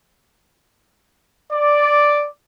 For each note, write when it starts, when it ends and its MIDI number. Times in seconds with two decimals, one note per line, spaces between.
1.53 2.28 74